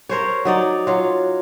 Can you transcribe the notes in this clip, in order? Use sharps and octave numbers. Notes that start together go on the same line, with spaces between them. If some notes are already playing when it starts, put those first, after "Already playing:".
A#4 C5 C#5
F#3 D#4 D5
F#3 F4